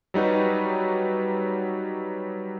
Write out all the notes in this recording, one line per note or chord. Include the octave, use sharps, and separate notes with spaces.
F#3 G3 D#4 F#4 B4